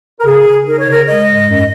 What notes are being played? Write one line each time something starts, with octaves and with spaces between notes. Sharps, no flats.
A#4
C#3 G#4
C#3
D#4 A#4
C#5
C#3 A#4
G#3 D#5
G#2
F#2